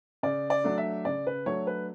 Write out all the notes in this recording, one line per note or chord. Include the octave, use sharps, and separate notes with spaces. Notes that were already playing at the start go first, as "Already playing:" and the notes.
C#3 D5
D5
F#3 A3 D4
E5
C#3 D5
B4
F#3 A3 D4 C#5
B4